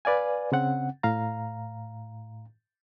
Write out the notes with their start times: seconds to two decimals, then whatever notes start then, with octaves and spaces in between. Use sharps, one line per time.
0.05 B4 D5 F5 G#5
0.52 C#3 C4 F#5
1.03 A2 F5 A#5